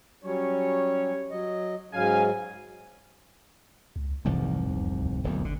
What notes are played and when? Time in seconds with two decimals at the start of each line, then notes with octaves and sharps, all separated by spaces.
0.24 F#3 G3 C#4 C#5
1.31 F#3 D#5
1.93 G#2 C#3 F#3 F5 G#5
3.96 C#2
4.25 F1 C2 G#2 E3
4.66 E2
4.95 D2
5.24 D1 B1 E2
5.45 G1 D3